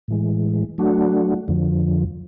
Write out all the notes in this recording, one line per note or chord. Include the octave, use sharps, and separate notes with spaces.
A2 E3 G#3
F#3 A3 D4 F#4
F2 D3 F3